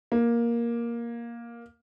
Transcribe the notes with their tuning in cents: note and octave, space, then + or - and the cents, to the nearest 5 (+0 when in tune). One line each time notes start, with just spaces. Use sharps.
A#3 +10